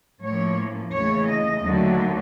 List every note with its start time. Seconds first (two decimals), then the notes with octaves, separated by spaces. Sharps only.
0.22 A2 F3 A#3 C#4 C#5
0.92 D#2 C#3 E3 A3 C#5
1.28 D#5
1.63 D#2 D3 F#3 A3